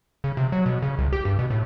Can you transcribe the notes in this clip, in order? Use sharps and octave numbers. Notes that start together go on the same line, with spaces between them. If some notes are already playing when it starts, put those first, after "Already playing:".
C#3
C3
F#3
B2
C#3
C2
G4
G2
B2
A2